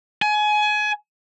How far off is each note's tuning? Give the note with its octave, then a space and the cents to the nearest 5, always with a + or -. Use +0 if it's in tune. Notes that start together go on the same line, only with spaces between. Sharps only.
G#5 +25